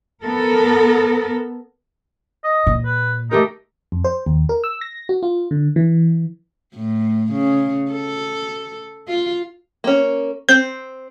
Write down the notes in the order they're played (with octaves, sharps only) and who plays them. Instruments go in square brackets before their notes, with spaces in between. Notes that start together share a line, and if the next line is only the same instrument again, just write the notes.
[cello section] B3 A4 A#4
[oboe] D#5
[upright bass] A#2
[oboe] B4
[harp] A3 G4 A#4 [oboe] D#4
[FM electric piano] F2
C5
D#2
A#4
E6
A#6
F#4
F4
D3
E3
[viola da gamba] A2
C#3
A4
F4
[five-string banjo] A#3 C#4
[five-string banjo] C4 [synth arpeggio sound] G6